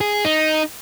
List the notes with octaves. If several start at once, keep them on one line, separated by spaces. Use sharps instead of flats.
G#4
D#4